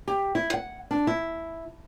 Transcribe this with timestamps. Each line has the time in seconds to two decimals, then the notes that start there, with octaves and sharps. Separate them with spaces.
0.07 G4
0.35 E4
0.54 F#5
0.91 D4
1.07 E4